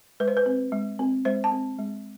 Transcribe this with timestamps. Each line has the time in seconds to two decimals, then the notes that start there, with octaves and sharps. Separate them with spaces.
0.20 G#3 B4
0.28 C5
0.37 B4
0.46 C4
0.72 G#3
0.99 C4
1.25 G#3 C5
1.44 A5
1.52 C4
1.79 G#3